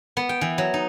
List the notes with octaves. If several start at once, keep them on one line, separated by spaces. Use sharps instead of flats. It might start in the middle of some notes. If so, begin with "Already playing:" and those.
B3
G5
E3
F#3
D#4